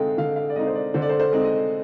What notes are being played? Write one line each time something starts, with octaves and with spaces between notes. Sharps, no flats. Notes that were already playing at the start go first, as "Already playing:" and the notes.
Already playing: D3 G#3 C4 D#4 F5 G5
D3 F5
F5
D5
G#3 C4 D#4 D#5
C5
D5
D3 C5
D5
C5
C5
G#3 C4 D#4
D#5